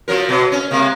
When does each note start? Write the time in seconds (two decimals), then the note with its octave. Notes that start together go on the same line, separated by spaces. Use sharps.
0.08 F3 F#3 A#4
0.29 B2 F#3
0.52 C#4
0.71 C3 G#3 A#3